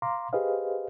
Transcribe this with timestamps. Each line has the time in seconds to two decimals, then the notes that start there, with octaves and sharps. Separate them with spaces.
0.02 F5 A#5 C6 D6
0.33 G4 G#4 B4 C5 D#5 F5